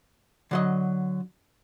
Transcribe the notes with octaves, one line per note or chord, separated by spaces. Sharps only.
D3 F#3 D#5